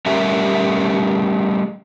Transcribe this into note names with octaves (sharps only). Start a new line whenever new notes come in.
G3 A3 C#4 G4 A#4 E5